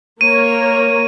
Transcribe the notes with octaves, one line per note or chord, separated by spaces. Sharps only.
A#3 A#4 C#5 D#7